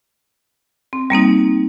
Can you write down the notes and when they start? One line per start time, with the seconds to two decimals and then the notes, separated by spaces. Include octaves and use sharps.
0.93 C4
1.10 G3 A#3 C4 D#4